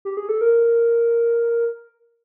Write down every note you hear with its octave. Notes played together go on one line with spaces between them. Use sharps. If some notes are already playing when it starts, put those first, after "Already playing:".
G4
G#4
A4
A#4